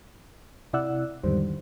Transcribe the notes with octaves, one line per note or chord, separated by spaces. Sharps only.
C3 E4 D5 F#5 E6 F#6
E2 G#2 D3 D#3 G3 C5